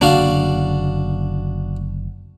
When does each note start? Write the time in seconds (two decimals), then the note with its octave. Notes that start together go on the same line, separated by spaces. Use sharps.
0.01 F#1 D3 A#3 D4 F#4 F5